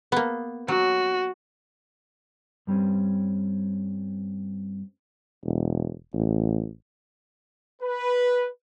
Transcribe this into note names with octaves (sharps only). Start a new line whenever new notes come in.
A#3 B3
F#3 F#4
G2 G3 C4 C#4
E1
A1
B4